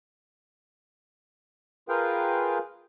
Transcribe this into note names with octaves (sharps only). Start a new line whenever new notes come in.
F4 G#4 A#4 B4 F5 G5